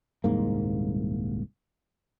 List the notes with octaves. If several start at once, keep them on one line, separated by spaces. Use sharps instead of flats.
D#1 C2 G#2 A#3